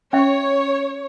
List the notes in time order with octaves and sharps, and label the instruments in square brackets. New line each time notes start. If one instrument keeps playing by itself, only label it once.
[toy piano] C#4 E5 [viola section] C#5